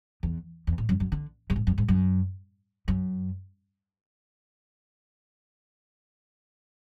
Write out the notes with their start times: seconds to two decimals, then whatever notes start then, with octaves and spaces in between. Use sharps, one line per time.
0.23 E2
0.67 E2
0.78 A2
0.89 F#2
1.00 F#2
1.12 D3
1.50 F#2
1.56 G#2
1.67 F#2
1.78 G#2
1.88 F#2
2.88 F#2